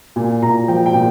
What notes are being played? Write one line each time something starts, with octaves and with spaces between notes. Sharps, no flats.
A#2 G#5
A#2 A#5
F3 G5
G5
A#2